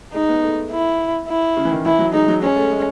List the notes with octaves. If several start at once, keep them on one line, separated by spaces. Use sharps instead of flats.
G#3 D#4
B3
A3
E4
E4
C#3
E3
D#3
E3 E4
F#3
G#3 D#4
F#3
G#3 C#4
A3
G#3